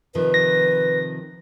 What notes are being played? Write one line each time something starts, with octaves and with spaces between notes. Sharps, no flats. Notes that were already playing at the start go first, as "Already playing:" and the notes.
C3 D#3 F3 B4
A#6